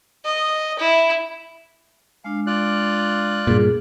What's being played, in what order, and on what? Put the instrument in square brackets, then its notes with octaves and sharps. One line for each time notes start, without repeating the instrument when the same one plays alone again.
[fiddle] D#5
E4
[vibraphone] G#3 D4 [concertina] F5
[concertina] F4 D5 F#6
[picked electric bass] G2 A#2 [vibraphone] G#4